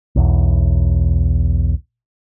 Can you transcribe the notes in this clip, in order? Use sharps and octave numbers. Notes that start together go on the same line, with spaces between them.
B1 E2